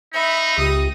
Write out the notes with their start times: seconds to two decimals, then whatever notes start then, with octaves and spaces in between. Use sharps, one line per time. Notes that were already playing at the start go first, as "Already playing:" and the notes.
0.14 D#4 E5 B5
0.58 C#2 G4 D#6